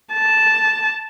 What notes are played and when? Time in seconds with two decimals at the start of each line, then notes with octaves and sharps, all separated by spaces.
0.13 A5